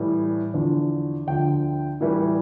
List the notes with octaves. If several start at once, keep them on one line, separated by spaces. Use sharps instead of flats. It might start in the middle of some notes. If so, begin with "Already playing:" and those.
Already playing: A2 E3 G3
E2 D3 F3
D2 D3 F3 G5
A2 E3 G3